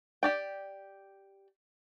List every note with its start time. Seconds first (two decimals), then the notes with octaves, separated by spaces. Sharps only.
0.23 G4 D5 G5